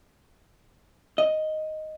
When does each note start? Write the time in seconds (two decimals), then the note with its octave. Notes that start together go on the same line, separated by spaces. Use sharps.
1.18 D#5